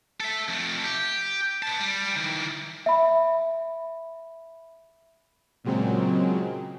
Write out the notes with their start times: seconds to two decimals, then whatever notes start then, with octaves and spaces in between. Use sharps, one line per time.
0.20 A4 E5
0.48 F2 A3
0.84 G4
1.63 B4 A5
1.79 G3
2.16 D#3 E3
2.86 E5 B5
5.64 A#2 C#3 F#3 G#3 C4